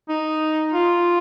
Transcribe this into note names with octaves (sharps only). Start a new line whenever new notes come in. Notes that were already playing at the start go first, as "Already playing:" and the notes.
D#4
F4